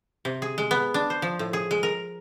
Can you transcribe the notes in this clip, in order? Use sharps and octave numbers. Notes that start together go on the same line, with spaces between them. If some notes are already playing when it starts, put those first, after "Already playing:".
C3
G#4
G#3
B3
D4
C5
F3
A2
G#4
G#3
A#4